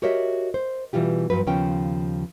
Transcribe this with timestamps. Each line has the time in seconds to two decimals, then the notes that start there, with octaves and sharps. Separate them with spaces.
0.02 F#4 G4 A#4 C#5 D#5 E5
0.54 C5
0.93 B2 E3 G3 F4 G4
1.30 G2 F3 F#3 B4
1.47 D#2 C#3 F3 B3 C#4 G5